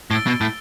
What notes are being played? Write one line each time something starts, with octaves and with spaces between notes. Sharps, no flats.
A2 E6 A6 D7 G7
B2
A2